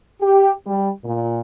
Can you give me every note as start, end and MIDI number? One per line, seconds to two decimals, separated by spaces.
0.21 0.52 67
0.66 0.89 55
1.04 1.39 46